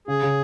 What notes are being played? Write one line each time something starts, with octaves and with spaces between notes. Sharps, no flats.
C#3 G#4
C#3